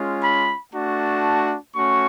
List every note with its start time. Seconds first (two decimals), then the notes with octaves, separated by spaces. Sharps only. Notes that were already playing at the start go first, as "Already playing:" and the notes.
Already playing: G#3 C#4 F4
0.23 B5
0.74 A3 D4 F#4 A5
1.76 A3 C#4 F#4 C#6